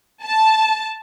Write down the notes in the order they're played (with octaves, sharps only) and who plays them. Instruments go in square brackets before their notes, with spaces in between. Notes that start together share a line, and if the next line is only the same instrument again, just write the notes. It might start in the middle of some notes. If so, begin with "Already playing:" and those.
[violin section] A5